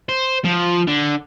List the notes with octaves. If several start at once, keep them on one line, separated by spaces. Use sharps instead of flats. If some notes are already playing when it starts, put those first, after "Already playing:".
C5
F3
D3